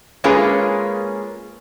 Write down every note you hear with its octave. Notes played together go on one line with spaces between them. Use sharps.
G#3 A#3 C#4 F4 G#4 B4